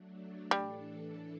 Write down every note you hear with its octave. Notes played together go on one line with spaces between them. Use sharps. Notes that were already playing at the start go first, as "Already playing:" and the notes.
Already playing: F#3 A3 D4
A2 E3 G3 A3 D4 A4